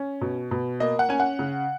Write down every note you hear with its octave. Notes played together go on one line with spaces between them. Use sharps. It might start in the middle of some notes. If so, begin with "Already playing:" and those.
Already playing: C#4
B2
B2
A#3 D#5
F#5
C#4 G#5
F#5
C#3